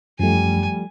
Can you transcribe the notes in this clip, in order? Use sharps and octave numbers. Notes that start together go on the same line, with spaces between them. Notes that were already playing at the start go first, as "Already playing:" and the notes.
F#2 F3 G3 A3 G#5